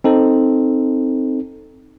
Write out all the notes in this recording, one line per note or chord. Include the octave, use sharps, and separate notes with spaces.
C4 D#4 A4